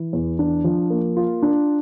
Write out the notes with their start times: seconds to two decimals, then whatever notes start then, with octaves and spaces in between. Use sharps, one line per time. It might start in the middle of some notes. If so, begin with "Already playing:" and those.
Already playing: E3
0.13 E2
0.39 D4
0.64 F3
0.90 A#3
1.17 F4
1.42 D4